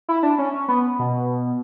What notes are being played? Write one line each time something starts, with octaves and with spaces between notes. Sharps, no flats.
E4
D4
C#4
C#4
B3
B2